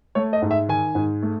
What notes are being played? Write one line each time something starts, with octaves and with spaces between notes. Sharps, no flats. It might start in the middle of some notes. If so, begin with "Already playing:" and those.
A3 C#5
D#5
G#2
E5
D#3 G#5
G#2
A3